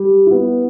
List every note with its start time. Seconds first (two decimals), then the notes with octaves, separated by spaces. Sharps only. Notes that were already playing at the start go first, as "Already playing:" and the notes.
Already playing: G3
0.26 B3 E4